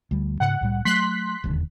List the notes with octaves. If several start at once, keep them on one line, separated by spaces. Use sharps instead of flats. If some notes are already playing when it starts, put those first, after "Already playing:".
D2 G3
G#2 C#3 F#5
C2 A2 G3
F#3 A3 C6 F#6 B6
E1 D#2 D3